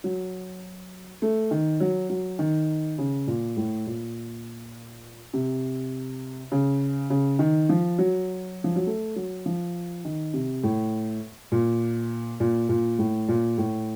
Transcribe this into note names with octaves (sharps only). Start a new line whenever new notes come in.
F#3
A3
D#3
F#3
F#3
D#3
C#3
A#2
A2
A#2
C3
C#3
C#3
D#3
F3
F#3
F3
F#3
A3
F#3
F3
D#3
C3
A2
A#2
A#2
A#2
A2
A#2
A2